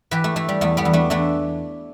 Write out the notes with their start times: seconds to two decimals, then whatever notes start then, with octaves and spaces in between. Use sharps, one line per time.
0.11 E3 G4 B4
0.24 A3
0.36 E3 A3
0.49 G3
0.61 E2 A3
0.77 G3 B3
0.85 E2
0.93 A3 D4
1.10 E3 A3 D4